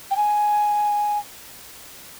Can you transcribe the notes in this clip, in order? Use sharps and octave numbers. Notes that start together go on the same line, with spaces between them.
G5
G#5